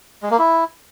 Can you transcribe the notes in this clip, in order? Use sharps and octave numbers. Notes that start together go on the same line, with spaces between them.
G#3
A#3
E4